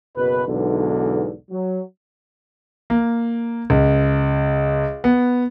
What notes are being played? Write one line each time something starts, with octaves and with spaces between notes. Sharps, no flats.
F#1 B2 B4
B1 E2 G#2 D3
F#3
A#3
C#2
B3